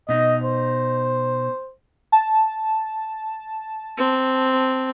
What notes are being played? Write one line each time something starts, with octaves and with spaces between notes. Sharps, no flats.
B2 D#4 D#5
C5
A5
C4